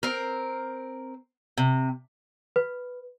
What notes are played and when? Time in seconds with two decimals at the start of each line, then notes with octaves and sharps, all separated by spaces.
0.03 C4 A#4
1.58 C3
2.56 B4